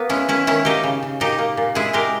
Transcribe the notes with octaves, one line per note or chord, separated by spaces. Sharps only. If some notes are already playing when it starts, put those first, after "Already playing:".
Already playing: A#3 B3
G#3 C#4 E4
D#3 C#4 E4
D#3 C#4 E4
A#3 D#4 G4
C#3
C#3
A#2 D#4 G4
A#3
A#2
G#3 E4 G#4
G#3 G4 A#4